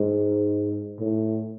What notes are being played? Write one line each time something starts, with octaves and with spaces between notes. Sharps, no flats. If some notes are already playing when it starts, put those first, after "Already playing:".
Already playing: G#2
A2